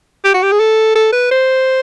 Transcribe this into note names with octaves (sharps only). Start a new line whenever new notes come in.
G4
F#4
G4
G#4
A4
A4
B4
C5